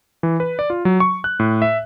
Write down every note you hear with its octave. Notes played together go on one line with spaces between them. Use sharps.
E3
B4
D5
F4
F#3
C#6
F#6
A2
E5